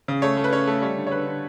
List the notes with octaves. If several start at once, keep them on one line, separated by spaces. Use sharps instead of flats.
C#3
A3 C#5
A3
B4
C#4 C#5
A3
G3 C#5
D3
C#5
D3 B4
D3